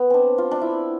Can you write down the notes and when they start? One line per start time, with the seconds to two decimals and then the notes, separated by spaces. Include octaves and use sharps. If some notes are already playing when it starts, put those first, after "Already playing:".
Already playing: B3
0.10 C4 D4
0.38 F4
0.51 D4
0.61 E4